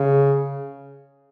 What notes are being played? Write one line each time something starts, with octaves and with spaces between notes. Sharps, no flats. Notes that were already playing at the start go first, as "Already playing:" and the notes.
Already playing: C#3